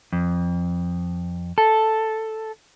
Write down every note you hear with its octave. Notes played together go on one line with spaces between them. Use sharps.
F2
A4